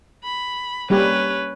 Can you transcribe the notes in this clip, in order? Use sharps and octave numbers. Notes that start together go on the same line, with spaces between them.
B5
G3 A#3 C#4 G4 B4